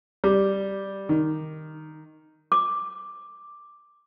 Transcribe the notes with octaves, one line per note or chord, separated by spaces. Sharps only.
G3
D#3
D6